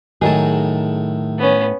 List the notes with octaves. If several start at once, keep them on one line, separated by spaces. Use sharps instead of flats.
A2 D#3 F#3 D#4 G#4 A5
B3 C#4